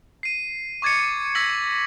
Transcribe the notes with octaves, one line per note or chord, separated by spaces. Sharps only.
C7 D#7
C#6 D6 G#6 A6 C#7
E6 G#6 A#6 B6 C#7 F#7